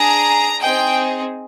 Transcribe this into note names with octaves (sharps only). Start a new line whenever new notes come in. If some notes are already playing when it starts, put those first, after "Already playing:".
Already playing: D4 G#4 A#5
C4 D#4 G#4 G5